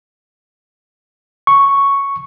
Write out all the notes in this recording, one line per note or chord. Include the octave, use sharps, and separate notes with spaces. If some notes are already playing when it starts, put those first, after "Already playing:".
C#6